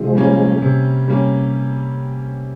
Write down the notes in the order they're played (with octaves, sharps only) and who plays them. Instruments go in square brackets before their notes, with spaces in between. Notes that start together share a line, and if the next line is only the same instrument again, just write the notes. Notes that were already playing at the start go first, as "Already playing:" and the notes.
Already playing: [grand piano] C3 [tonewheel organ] F3 G#3
[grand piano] G3 A#3 C#4
C3
G3 A#3 C#4